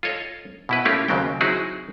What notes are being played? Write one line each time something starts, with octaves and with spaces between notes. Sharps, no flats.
F4 A4 C#5 D#5
B2 E4 B4
A3 A#3 C#4 E4 F4 G4
D#2 C#3 F#3 C4 G5
F#3 C4 D#4 E4 F#4 G#4